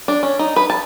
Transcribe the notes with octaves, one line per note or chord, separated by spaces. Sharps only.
D4
C#4
D#4
B4
A5